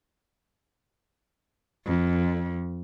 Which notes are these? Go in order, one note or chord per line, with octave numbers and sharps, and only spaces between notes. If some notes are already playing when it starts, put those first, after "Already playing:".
F2